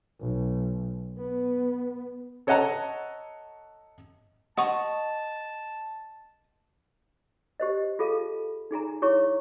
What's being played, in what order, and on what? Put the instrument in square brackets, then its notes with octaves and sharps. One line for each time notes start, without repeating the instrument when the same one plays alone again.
[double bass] B1
B3
[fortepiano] A4 C#5 D#5 F#5 A5 A#5
[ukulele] D#5 [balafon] F#5 C#6 [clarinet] A5
[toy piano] G4 C5 D#5
F4 G#4 A4 F5 A5
D#4 G#4 G#5 A#5
E4 G#4 C#5 A#5 C#6